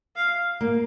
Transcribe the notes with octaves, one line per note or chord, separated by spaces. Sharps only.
F5
A#3